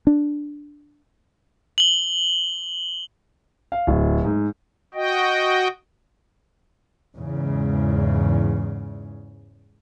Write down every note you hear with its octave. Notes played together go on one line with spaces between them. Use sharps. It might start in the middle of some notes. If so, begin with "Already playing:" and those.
D4
F#7 G7
F5
D1
G#2
F#4 D#5 G5
E2 G#2 C#3